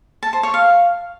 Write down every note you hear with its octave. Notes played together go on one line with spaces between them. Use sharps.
A5
C5
C#5
F5